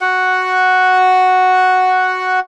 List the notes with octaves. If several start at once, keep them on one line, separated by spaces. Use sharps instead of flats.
F#4 F#5